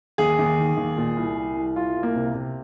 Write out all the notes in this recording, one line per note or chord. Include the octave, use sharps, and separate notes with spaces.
D#2 G#4
D#2
D#3
D#2
A#2
C2
C2
C2
C2 F4
C2
A#3
C3
C3